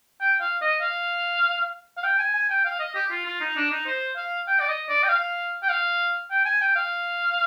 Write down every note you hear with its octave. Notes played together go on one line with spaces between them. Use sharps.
G5
F5
D#5
F5
F5
G5
G#5
G#5
G5
F5
D#5
G4
F4
F4
D#4
D4
D#4
C5
F5
G5
D5
D#5
D5
G5
F5
G5
F5
G5
G#5
G5
F5